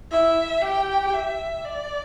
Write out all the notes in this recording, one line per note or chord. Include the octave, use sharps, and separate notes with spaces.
E4 E5
G4 G5
E5
D5